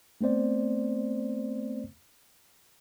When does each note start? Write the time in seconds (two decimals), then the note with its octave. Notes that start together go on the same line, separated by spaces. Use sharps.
0.21 A3 B3 C4 C5 D5